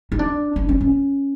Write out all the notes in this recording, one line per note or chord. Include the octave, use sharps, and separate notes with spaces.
D#4
D4
D4
C#4
C#4